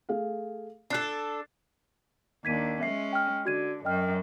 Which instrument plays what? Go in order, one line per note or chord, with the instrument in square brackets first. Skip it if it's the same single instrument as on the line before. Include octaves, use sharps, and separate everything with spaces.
[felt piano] A3 G#4 F5
[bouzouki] D4 A4 [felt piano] F#6 C7
[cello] D#2 D4 [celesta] G#6 B6 D#7
[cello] G#3 C#4 [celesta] E5 C7
[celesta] G5 F6
[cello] D3 [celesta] F#4 G#6 D#7
[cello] F#2 [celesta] D#5 G5 F6